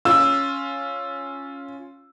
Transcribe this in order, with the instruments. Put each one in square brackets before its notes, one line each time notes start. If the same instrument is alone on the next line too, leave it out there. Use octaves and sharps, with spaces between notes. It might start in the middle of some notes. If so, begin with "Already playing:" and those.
[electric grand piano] C#4 F4 [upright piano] E6